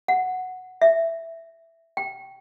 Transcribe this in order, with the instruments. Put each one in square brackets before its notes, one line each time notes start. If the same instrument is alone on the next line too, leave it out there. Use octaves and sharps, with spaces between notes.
[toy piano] F#5
E5
G5